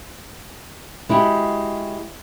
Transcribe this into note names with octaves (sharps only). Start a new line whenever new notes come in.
G#3 E4 F#4 G4